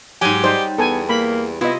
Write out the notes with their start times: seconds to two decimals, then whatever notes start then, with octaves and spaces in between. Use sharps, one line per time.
0.21 G#2 F#3 G4 G#5
0.44 G3 D#4 C5
0.78 E2 B3 A4 G#5
1.09 A#3 B5
1.61 C3 B3 E4 F4 D#5